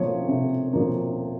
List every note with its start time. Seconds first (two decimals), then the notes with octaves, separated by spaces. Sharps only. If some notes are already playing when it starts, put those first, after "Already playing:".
Already playing: C3 F3 A#3 C#5
0.28 C3
0.73 F3 A#3